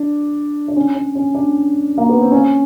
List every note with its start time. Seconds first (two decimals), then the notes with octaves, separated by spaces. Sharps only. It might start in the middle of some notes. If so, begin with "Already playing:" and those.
Already playing: D4
0.68 D4
0.76 C#4
0.95 C#4
1.15 C#4
1.35 D4
1.98 A#3
2.09 B3
2.21 C4
2.32 C#4